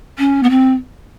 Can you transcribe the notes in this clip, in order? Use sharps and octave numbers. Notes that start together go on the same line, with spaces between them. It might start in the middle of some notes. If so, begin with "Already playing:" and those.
C#4
B3
C4